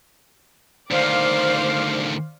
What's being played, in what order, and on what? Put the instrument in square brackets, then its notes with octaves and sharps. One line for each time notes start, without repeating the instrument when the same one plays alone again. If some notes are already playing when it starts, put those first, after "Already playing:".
[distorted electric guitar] D2 D#3 [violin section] C5 D5 F5